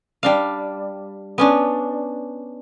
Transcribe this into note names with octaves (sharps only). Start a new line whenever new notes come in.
G3 D4 F5
B3 C#4 D4